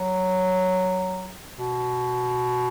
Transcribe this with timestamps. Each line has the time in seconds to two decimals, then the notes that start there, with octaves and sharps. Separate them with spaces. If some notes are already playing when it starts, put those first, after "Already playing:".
Already playing: F#3
1.58 B2